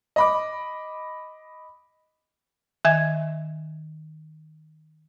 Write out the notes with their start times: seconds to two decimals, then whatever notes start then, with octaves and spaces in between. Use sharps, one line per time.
0.16 D#5 B5 D6
2.85 D#3 E5 G#5 G#6